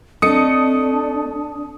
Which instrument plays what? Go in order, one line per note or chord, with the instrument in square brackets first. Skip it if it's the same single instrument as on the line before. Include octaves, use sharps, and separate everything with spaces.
[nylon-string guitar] A3 D#5 [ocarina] C4 [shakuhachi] D4 [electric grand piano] D#6 C#7